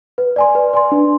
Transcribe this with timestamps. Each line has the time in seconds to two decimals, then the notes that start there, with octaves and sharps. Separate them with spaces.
0.18 B4
0.36 D5 G#5 C6
0.55 B4
0.73 D5 G#5 C6
0.92 D4